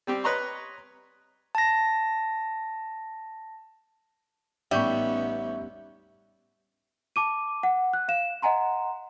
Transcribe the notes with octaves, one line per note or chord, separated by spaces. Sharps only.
G3 C4 G4
B4 C#5 D#5 A#5 C6 C#6
A5 A#6
A1 G3 B3 C#4 D#4 E5 C#6 G6
A5 D6 D#7
F#5
F#6
F5 E7
D#5 F#5 G#5 A#5 C6